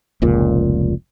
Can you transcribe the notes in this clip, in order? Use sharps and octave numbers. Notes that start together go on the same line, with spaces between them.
F1 C#2 A#2